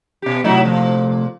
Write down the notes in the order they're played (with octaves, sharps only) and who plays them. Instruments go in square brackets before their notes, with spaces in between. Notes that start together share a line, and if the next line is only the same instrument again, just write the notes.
[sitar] B2 G4
[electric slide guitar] C3 A3 [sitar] F#3 D#4 E4
[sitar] A#2 F3